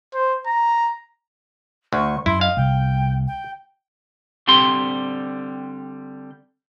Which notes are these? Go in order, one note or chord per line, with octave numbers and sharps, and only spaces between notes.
C5
A#5
D2 C#6
F#2 E4 C6
D#5 F5
C2 G5
G5
D3 G3 C4 G4 C6